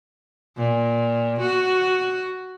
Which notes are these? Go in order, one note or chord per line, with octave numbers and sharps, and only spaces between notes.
A#2
F#4